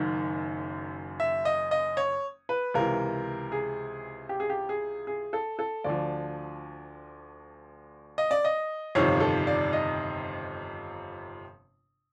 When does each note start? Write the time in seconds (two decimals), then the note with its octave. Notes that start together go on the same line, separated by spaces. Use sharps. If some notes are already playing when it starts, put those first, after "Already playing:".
Already playing: F#1 F#2 D#3
1.20 E5
1.45 D#5
1.71 D#5
1.97 C#5
2.49 B4
2.74 C#2 C3 E3 A#4
3.52 G#4
4.29 G4
4.40 G#4
4.50 G4
4.69 G#4
5.07 G#4
5.33 A4
5.59 A4
5.84 D2 D3 F3 D5
8.18 D#5
8.31 D5
8.45 D#5
8.95 G1 F2 C3 D#3 C#5
9.20 A4
9.47 D5
9.73 D#5